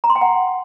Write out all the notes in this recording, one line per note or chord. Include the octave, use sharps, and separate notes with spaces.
A#5
C6
G5
F#5